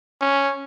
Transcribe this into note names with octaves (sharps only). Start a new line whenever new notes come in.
C#4